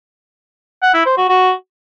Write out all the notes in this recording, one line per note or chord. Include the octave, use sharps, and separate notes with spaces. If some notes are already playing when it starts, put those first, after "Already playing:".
F#5
E4
C5
F#4
F#4